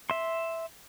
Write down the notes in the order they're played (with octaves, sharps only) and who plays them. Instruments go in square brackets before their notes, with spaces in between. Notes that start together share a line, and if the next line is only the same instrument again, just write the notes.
[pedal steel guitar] E5 C6